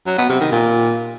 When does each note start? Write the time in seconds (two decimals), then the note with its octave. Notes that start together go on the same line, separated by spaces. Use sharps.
0.07 F#3
0.18 B3
0.29 C3
0.41 D#3
0.52 A#2